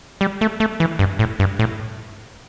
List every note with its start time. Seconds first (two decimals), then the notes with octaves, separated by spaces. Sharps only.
0.21 G3
0.41 A3
0.60 A3
0.80 E3
0.99 G2
1.19 A2
1.39 G2
1.59 A2